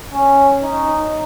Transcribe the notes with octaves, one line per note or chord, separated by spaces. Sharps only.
C#4
D#4